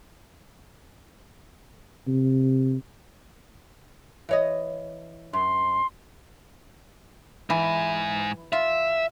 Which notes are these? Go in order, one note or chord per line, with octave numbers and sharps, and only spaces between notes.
C3
E3 C#5 D#5
F#2 C6
G#2 E3 G#5
F4 E5